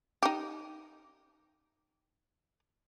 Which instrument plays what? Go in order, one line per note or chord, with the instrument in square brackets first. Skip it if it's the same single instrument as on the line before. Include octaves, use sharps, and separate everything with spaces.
[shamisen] D#4 G4